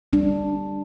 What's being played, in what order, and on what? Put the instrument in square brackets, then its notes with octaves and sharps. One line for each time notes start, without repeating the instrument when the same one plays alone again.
[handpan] G3 D4